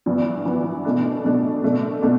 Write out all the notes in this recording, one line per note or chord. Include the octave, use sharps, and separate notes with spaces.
G2 E3 B3
G2 E3 B3
B2 A3 D4
B2 A3 D4
B2 A3 D4
B2 A3 D4